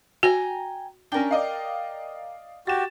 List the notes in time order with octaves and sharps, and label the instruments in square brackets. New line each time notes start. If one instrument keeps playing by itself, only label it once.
[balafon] F#4 [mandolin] G5 G#5 A#5
[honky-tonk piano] C#4 D4 [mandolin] A#4 G5
[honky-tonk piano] D5 D#5 F5
[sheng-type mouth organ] F#4 G4 [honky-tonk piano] A6 E7